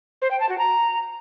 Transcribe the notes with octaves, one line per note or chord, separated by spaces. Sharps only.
C5
G5
A5
F#4
A#5